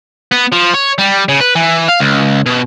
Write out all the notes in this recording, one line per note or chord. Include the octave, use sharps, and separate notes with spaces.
B3
F3
C#5
G3
C#3
B4
E3
F5
C#2
B2